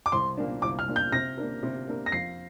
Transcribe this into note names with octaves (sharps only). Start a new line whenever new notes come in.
D6
C2 C6
A#2 A#3 D4
C2 D6
F6
A#2 A#3 D4
G6
C3 A#6
A#3 D4 A#4
C3
A#3 D4 A#4
A#6
F2 C7